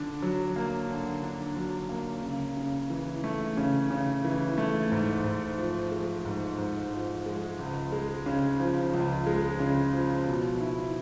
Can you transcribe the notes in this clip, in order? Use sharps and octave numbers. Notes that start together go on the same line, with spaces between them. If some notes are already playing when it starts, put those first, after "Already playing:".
Already playing: D3 D4
F#3
A#3
D3
D4
F#3
A#3
C#3
C#3
E3
A3
C#3
C#3
E3
A3
G#2
G#2
F3
G#3
G#2
G#2
F3
G#3
C#2
G#3
C#3
F3
C#2
G#3
C#3
F3
B2
E4